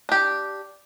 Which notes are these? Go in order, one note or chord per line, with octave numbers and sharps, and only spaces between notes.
D4 G4